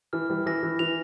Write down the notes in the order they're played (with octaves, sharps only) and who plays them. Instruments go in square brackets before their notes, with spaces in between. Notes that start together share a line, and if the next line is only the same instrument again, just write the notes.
[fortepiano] E3 [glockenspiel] F6
[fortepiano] E3 G3
[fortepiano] E3 [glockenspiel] A#6
[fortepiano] E3
[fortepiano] E3 [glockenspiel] F7